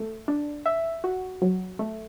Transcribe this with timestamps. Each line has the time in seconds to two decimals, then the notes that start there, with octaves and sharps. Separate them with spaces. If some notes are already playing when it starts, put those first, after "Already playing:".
Already playing: A3
0.28 D4
0.66 E5
1.04 F#4
1.42 F#3
1.79 A3